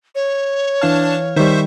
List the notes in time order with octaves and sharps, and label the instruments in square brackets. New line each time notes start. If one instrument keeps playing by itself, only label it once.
[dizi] C#5
[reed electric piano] E3 F5 F6 [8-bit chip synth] D4 A5
[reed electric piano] D#3 G3 [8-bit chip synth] C5 E5 C#6